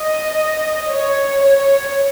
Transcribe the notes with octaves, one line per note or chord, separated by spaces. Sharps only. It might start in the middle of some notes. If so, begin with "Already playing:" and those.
Already playing: D#5
C#5
C#5